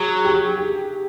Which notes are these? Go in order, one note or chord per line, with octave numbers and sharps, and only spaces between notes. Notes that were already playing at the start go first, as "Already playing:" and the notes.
Already playing: F#3 G#4
G4
G4